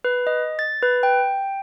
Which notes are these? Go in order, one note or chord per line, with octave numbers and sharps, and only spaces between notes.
B4
D#5
A6
B4
G5